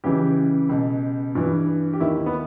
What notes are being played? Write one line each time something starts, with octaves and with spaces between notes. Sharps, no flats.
C#2 C#3 E3 G4
C#2 B2
G2 E3
G4
D#2 D#3 E4
B3